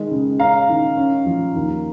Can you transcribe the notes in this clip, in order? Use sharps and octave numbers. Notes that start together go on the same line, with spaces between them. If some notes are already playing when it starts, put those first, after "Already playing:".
Already playing: D#3 G#3
C#3
C#4 F5 A#5
D#3
C#4
F3
D#2